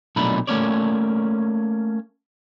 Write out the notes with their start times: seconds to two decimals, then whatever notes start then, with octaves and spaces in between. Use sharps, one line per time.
0.16 B1 A#2 A3 D4 D#4 B5
0.47 A3 A#3 C#4 C#5 D5